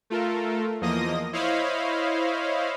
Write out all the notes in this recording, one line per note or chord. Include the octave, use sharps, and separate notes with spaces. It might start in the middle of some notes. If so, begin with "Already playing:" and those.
A3 F4 A4 A#4
E2 F3 A#3 D#5 D#6 A#6
E4 C5 C#5 D#5 F5 B5